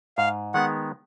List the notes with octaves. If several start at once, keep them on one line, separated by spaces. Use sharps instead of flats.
G#2 F5
D#3 G#3 B3 F#5